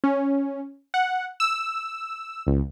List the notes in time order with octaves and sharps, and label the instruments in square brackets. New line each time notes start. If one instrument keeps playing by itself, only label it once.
[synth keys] C#4
F#5
E6
C#2